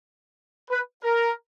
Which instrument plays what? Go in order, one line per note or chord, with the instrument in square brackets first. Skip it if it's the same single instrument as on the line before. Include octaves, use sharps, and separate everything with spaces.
[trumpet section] B4
A#4